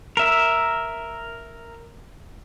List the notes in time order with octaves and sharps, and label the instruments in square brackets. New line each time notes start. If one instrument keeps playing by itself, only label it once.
[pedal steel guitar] A#4 E5